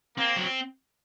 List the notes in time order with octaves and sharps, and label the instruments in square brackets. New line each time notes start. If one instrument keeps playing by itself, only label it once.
[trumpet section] A#3 [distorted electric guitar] C4
[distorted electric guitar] F#3